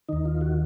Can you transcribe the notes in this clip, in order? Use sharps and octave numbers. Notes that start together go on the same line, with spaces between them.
D#2 D#3 D#4
F4
F#4